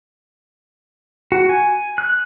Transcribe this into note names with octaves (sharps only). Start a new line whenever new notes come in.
F#4
G#5
F#6